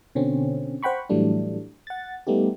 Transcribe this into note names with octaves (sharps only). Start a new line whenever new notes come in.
B2 D3 C4 C#4
C5 F#5 G5 B5 C#6
A2 E3 F#3 G3 A3 D4
F#5 A6
G3 A3 B3 D#4 G4